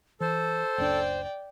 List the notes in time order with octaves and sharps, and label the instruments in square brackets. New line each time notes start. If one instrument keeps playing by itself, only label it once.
[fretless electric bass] E3 [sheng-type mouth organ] A4 [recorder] C5
[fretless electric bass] F#1 C#2 D4 [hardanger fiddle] D5 G5